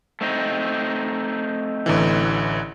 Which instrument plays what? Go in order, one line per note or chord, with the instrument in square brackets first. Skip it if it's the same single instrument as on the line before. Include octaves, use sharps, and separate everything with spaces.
[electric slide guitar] A3 C4 D#4
[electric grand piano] A1 D3 E3